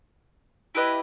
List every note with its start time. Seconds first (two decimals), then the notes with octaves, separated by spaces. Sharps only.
0.75 E4 G4 B4 D#5